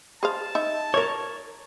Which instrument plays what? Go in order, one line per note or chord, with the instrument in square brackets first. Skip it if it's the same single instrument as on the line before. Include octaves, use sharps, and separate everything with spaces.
[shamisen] G#4 C5 F5 [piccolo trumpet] A5
[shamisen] D#4 E5
[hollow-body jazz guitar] A#4 C#5